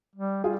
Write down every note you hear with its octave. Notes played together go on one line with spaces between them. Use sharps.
G3
G3 F4 G#4